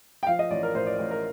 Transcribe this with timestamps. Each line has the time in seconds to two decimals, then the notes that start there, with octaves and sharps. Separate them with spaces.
0.23 G5
0.27 F3 F5
0.39 D#5
0.51 A1 D5
0.63 A#4
0.74 A2 C5
0.87 D5
0.99 A1
1.11 A#4